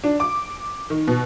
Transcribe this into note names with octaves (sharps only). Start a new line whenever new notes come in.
D4
D6
D#3
B2